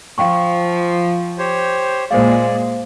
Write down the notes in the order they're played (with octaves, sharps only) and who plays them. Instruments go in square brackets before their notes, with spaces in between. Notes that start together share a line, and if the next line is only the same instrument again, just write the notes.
[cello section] F3 [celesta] F5 G5 C#6
[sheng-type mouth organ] G4 C5 C#5
[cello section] A#2 G#3 [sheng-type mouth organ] G#4 D5 [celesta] C5 F5